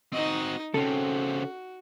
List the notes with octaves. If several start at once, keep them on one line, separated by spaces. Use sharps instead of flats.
C4 D#4 F#4 D#5
C#3 C4 C#4 F#4 A4